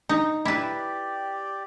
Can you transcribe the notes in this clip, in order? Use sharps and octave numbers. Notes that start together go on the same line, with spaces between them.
D#4
E4 G4 B4 D5